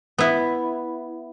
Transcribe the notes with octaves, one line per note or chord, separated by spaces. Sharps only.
B3 E4